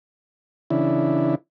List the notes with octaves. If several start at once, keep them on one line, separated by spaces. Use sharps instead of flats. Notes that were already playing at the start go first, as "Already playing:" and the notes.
C#3 E3 D4 E4